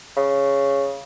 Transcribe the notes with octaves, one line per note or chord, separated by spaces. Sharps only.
C#3